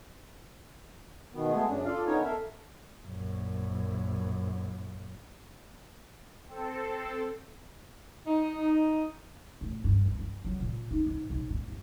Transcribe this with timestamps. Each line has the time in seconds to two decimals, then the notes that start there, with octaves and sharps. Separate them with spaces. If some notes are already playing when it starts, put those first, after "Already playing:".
1.34 B2 D#3 B3
1.51 G#3 A3 B3 G#4
1.68 F#2 C#3 D4
1.85 F4 A4 D5 F5
2.06 D3 B3 C#4 D#4 A#4 C#5
2.24 A4 A#4 E5 F5
3.05 A#1 F#2
6.48 C4 A4
8.27 D#4
9.61 A2
9.84 G2
10.06 F2
10.19 G2
10.45 F#3
10.60 A#2
10.91 D#4
11.06 G#2
11.30 B1
11.50 A#2
11.68 G1